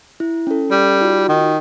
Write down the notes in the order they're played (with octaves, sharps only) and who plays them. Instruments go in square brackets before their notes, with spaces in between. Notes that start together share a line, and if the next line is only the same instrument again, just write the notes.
[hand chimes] E4
C#4 A4
[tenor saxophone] G3
[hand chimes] D#4 F4 F#4
[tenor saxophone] D#3